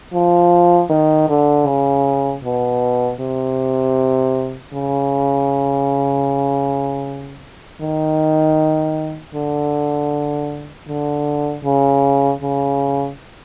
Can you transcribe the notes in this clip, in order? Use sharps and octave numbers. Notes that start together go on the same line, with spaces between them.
F3
D#3
D3
C#3
B2
C3
C#3
D#3
D3
D3
C#3
C#3